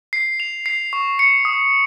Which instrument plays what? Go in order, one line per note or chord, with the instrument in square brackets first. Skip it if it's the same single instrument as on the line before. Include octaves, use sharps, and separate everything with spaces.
[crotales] C7
F7
C7
C#6
C#7
D#6